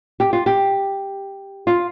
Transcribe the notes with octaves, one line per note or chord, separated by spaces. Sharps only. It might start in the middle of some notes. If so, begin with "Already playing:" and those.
G4
F4
G4
F4